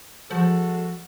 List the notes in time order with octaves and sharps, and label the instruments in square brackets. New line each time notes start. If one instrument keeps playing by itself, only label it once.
[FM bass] F3 [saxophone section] G#3 F#4 A4